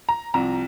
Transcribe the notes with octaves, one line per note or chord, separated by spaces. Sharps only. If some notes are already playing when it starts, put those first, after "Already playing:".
A#5
C2 C3 F3 A#5